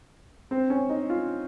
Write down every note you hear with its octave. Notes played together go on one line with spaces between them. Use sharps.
C4
C#4
D#4
F4